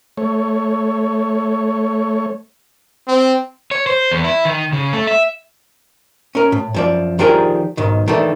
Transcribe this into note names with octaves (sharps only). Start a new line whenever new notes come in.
A3 C#5
C4
C#5
C5
E2
E4
D#3
C#3
A3
E5
C#4 A#4
A2
F#2 F3 D5
D#3 F3 D4 G4 G#4 A#4
B1 G#2 D#3
D#3 E3 A3 D4